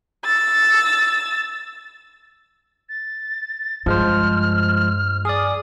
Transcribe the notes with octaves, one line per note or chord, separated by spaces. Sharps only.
E6 A6
A6
G2 F3 G#3 C5 F6
G#4 D5 D#6